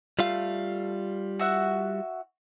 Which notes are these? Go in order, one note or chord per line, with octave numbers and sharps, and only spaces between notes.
G3 A3 F4 F5
F#4 E5 F#5